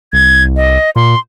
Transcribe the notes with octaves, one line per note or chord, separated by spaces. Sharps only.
C2 G#6
D#5
A#2 C6